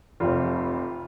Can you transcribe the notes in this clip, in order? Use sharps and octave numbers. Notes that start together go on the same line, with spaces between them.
F1 F2 C3 F4